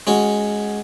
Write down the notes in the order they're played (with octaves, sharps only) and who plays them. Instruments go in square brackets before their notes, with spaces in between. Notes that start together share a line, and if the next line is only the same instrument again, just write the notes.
[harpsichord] G#3 C#4 F#4